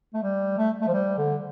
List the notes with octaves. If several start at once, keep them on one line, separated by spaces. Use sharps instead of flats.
A3
G3
A3
A3
F3
G3
D3